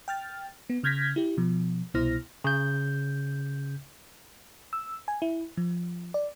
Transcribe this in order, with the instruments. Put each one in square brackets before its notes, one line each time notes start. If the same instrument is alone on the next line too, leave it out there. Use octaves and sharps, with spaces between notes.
[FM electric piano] G5 F6 A6
B3
C#3 F6 G6 G#6 A#6 B6
E4 G4
B2 F3
C2 B2 E4 C5 F6 A#6
[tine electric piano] C#3 G6
[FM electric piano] E6
G#5
E4
F3
D5